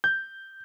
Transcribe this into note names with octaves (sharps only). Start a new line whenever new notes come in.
G6